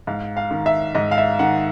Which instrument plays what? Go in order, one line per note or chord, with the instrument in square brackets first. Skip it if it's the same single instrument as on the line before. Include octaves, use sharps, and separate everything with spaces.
[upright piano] G#2 F5
F5
D#3
E5
G#2 D#5
F5
E5
D#3 F#5